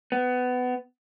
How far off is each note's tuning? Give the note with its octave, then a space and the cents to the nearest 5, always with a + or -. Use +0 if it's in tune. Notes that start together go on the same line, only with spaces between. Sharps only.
B3 +20